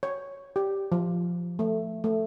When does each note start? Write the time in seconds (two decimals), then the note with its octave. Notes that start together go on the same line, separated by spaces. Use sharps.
0.03 C#5
0.56 G4
0.92 F3
1.59 A3
2.04 A3